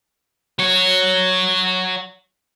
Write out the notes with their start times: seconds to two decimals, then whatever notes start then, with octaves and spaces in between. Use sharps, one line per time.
0.59 F#3 C#5